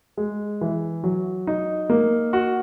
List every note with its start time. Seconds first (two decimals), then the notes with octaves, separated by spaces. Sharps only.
0.17 G#3
0.61 E3
1.04 F#3
1.47 D#4
1.90 A#3
2.33 F#4